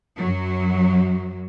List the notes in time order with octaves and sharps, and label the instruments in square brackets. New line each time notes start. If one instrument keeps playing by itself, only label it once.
[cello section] F#2 F#3